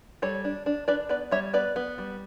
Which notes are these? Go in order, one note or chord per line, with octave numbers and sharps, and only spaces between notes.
G3 A4 C#5
D4
D4
D4 B4 D5
B3 B4 D5
G3 C#5 E5
B3 B4 D5
B3
G3